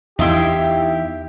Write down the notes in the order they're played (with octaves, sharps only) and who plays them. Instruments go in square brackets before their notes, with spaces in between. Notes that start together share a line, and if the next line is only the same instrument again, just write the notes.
[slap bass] E2 E3 [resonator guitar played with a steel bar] D#4 E4 [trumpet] G4 [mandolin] E5 F5 C6